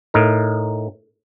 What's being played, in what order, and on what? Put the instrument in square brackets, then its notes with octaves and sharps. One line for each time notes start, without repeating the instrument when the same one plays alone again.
[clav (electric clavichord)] A2 D#4 A#4